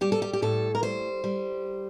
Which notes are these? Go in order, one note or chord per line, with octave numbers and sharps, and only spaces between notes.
G3 G4
A4
G4
G4
A2 A4
A#4
G3 C5
G3